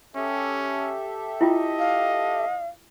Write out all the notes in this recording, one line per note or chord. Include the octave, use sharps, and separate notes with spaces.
C#4 G4 A4 E5
E4 F4 D#5 G5
F5